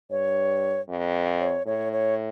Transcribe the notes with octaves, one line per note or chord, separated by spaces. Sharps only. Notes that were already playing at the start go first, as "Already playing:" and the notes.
G2 C#5
F2
C#5
A2 C#5
C#5